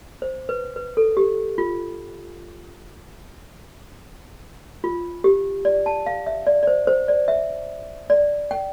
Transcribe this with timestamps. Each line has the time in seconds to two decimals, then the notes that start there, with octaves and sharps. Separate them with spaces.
0.22 C5
0.49 B4
0.76 B4
0.97 A4
1.17 G4
1.58 F4
4.84 F4
5.24 G4
5.65 D5
5.86 A5
6.06 F5
6.27 E5
6.47 D5
6.63 D5
6.67 C5
6.87 C5
7.08 D5
7.28 E5
8.10 D5
8.51 G5